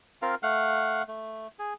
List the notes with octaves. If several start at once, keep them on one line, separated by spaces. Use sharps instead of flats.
C4 F4 A#4 F5
A3 F5 F#5
A3
G#4